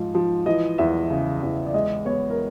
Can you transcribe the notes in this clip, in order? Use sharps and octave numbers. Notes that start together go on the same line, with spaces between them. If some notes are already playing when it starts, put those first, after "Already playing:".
Already playing: G#2 F3 G#3
F3
E3 D#5
E2 E5
C#3
E2
D5
G#3 D#5
B3 C#5
A#4